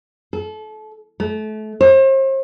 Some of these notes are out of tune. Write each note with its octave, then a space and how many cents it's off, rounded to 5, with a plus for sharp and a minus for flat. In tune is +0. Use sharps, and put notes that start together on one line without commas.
A4 -30
A3 -30
C5 +40